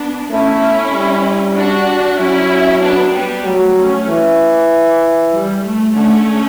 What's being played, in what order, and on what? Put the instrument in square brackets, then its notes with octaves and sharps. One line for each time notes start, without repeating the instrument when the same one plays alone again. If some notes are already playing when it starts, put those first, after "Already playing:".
Already playing: [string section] B3 D4
[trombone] A3 [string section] C#4 E4
[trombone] G3
[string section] D4 F#4
[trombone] F#3 [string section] C#4 E4
[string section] B3 D4
G3 B3
[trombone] F#3 [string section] A3
[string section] A3 C#4
[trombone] E3
[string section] G3
A3
[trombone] D3 [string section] A3 C#4